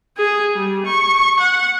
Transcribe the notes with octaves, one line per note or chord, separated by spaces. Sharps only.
G#4
G3
C#6
F#5